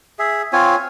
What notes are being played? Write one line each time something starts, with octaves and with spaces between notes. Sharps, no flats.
G#4 E5
C4 F4 C#5 G#5